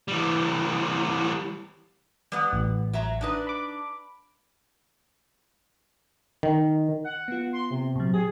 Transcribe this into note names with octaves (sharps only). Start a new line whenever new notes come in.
E3 G3
G3 B3 F#5
A1
F#3 E5 A#5
D4 D#4 B4
B5 D6
D#3
F#5
B3 F4
C6
C3
A#2 F#3
G4 G#4